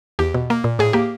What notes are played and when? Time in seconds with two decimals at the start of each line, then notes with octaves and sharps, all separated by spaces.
0.19 E2 G4
0.34 B2
0.50 A#3
0.64 A#2
0.79 A2 G#4
0.93 A#3 G4